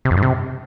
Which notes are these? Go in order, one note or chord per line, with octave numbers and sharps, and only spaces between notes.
C3
F2
G2
C3